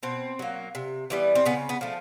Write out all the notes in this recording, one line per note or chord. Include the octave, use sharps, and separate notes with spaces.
B2 C4
F#3 A#3
C3
E3 G3 B3
C4
C#3 B3
B3
F3 A3